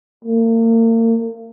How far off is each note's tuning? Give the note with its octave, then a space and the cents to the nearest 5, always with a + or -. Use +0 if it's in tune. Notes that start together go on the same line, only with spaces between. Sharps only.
A#3 -40